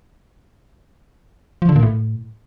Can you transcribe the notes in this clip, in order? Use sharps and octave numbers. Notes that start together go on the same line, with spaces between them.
F3
D3
A#2
A2